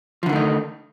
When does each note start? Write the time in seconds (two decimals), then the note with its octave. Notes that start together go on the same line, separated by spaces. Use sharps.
0.23 F3
0.26 D3
0.29 D#3
0.32 A3
0.36 D#4